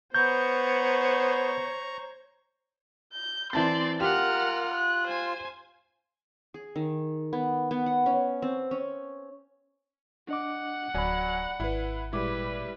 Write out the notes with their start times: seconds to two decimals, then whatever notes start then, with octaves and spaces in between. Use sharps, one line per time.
0.14 B3 C5 C#5 A#5 C#6 G6
3.14 G6
3.53 E3 C4 D5 A5 C6 A6
4.00 F4 G4 A#4 F#5 F6
4.74 F#6
5.07 C5 G#5
6.54 G#4
6.76 D#3
7.33 B3
7.71 B3
7.86 F#5
8.06 C#4
8.42 C4
8.71 C#4
10.29 D4 D#5 F#5 D6
10.94 D1 F#3 D5 G#5 B5
11.60 G#1 E4 B4
12.13 A#2 G3 G#3 E4 B4 D6